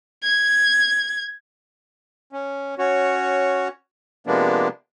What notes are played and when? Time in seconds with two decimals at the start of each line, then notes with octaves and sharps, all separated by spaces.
0.23 G#6
2.32 C#4
2.78 C#4 F#4 C#5
4.27 C3 F3 G#3 A#3 B3 D4